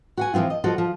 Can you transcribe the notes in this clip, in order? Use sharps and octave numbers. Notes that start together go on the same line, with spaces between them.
F#4 F#5 G#5
E3 F3 G#3 C4 F4
D#5
F3 F#4 A4
F3